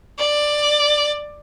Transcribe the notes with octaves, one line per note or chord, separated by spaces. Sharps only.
D5